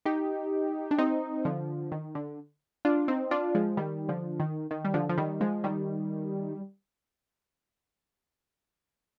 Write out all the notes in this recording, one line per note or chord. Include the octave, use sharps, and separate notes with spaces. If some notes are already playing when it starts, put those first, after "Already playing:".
D#4 G4
D4
C4 D#4
D3 F3
D#3
D3
D4 F4
C4 D#4
D4 F4
F3 G#3
D#3 G3
D3 F3
D#3
D#3
G3
D3 F3
F3
D#3 G3
F3 G#3
D#3 G3